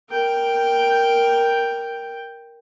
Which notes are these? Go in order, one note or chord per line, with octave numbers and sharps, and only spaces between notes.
A#4 G5